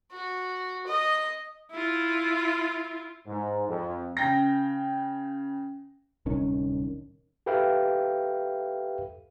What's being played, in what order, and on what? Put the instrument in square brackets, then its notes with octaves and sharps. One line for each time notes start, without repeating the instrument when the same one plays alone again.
[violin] F#4
D#5
[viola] E4 F4
[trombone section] G#2
F2
[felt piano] C#3 G5 A#6
[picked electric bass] D1 C2 D#3 C#4
[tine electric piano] G4 A4 B4 E5 F5 G5